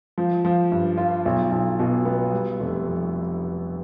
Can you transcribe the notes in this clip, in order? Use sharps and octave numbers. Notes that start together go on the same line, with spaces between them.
F3
F3
G2
F4
B1
B1
B2
B3
G3
F1
F2